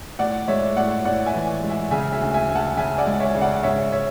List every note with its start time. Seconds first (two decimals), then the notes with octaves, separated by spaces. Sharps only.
0.19 A2 D5 F#5
0.48 G#3 C#5 E5
0.77 A2 D5 F#5
1.05 A2 D5 F#5
1.26 E5 G#5
1.34 E3
1.63 G#3
1.69 E5 G#5
1.91 C#3 E5 G#5
2.13 E5 G#5
2.20 D2
2.34 E5 G#5
2.49 D2
2.55 F#5 A5
2.77 C#3 E5 G#5
2.98 D5 F#5
3.06 G#3
3.20 C#5 E5
3.35 C#3
3.41 D5 F#5
3.63 G#2 C#5 E5
3.92 C#5 E5